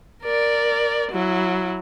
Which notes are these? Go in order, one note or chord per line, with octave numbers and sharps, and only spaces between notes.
A#4 D5
F#3 E4